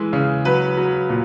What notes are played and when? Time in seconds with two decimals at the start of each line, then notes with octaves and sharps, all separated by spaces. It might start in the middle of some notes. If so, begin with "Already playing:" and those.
Already playing: E3 G#3
0.13 C#3
0.45 F#3 B4
0.77 F#3
1.09 A#2